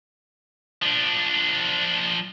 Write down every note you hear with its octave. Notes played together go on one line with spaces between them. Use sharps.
F3 D4